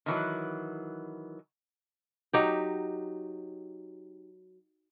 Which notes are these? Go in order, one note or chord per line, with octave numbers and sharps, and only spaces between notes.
D#3 E3 F#3
F#3 D#4 G4